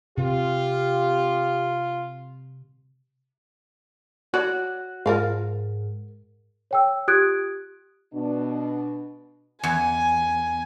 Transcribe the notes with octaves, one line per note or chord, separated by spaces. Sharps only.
C3 F4 G4
F#4 C#5 D5
G#2 F4 A#4 F5
C#5 G5 E6
F4 G4 D#6 F#6 G#6 D7
B2 D4
E2 G#5